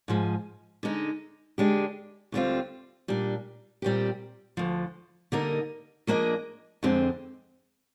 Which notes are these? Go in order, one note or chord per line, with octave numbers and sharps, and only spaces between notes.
G#2 F3 G#3
D3 G#3 D#4
D3 G#3 D4 G4
D2 D3 G3 C4 F4
A#2 G3 D4
A#2 G3 C4 G4
D2 D3 F3
D3 G3 A#3 D#4 A#4
F3 A#3 D4 G#4 D#5
F2 D3 G#3 C4